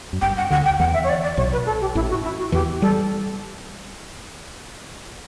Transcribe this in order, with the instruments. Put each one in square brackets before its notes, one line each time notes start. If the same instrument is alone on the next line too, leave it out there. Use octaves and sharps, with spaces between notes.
[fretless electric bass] F#2
[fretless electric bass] G1 G2 [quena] G5
[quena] F#5
[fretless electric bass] D2 D3 [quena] F#5
[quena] G5
[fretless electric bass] E2 E3 [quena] F#5
[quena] E5
C#5
D5
D5
[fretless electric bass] B1 B2 [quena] C#5
[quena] B4
A4
G4
[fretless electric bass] A1 A2 [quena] E4
[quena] F#4
E4
F#4
[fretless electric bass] E2 E3 [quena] G4
[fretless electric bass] G3 [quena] A4